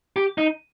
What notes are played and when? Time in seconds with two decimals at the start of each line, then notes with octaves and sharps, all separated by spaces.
0.16 G4
0.38 D#4